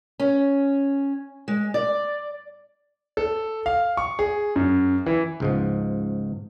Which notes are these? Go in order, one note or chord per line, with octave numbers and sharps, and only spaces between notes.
C#4
G#3
D5
A4
F5
C#6
G#4
F#2
E3
C#2 G#2 F3